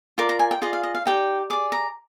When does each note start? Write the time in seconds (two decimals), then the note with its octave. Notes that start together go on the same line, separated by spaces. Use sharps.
0.18 F4 A#4 D5 D6
0.29 A#5
0.39 G#5
0.51 G5
0.62 F4 G#4 D5 D#5
0.73 F5
0.83 D#5
0.95 F5
1.05 D#4 G4 D5 G5
1.50 G#4 D5 D6
1.72 A#5